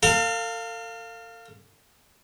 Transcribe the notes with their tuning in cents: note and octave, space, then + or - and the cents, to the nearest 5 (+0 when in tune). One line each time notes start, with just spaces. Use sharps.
A4 +45 F5 +0